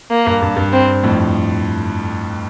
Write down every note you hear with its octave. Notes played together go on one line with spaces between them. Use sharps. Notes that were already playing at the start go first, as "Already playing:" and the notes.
A#3
G2
G2
G2
C4
F2 A2